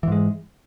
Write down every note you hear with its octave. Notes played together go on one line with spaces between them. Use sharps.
G#2 E3 G#3